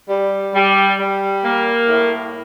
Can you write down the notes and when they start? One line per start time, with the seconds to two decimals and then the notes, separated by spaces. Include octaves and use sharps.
0.09 G3
0.55 G3
0.99 G3
1.44 A#3
1.88 A2